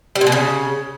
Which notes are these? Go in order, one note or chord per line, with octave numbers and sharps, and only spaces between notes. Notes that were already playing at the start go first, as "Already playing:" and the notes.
G3
A#2
B2
C#3